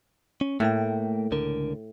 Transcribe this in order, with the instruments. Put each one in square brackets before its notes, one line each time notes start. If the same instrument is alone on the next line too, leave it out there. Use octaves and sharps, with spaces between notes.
[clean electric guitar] C#4
[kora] A2 [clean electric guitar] A3 A#3 G5
[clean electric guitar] C#2 D3 A#4